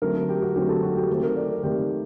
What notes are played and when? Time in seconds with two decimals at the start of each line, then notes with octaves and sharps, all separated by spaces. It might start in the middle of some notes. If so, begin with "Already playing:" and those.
0.02 D3 F#3 A3 C4 A#4
0.15 A4
0.29 G4
0.42 F#4
0.56 D3 F#3 A3 C4 G4
0.69 A4
0.83 F#4
0.96 G4
1.09 D#3 A3 C4 A4
1.23 A#4
1.37 D5
1.50 A#4
1.63 D#3 A3 C4 G4